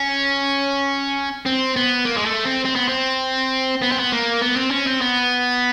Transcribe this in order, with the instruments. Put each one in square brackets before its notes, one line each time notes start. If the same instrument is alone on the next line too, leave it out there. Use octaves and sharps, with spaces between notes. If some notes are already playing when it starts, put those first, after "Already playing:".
Already playing: [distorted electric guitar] C#4
C4
B3
A#3
G#3
A3
C4
C4
B3
C4
B3
C4
B3
A#3
B3
C4
C#4
C4
B3